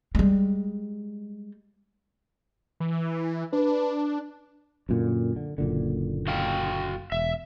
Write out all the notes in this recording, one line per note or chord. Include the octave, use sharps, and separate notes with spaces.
G3 G#3
E3
D4 B4
F#2 A#2 D3
D3
F#1 A#2 D3
F#4 F5 G5
E1 E5